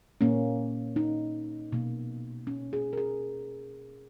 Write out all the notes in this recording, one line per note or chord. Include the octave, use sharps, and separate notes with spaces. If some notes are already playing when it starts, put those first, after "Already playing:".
A#2 A#3 C#4
D#4
B2 A#3
C#4
G#4
A#4
G#4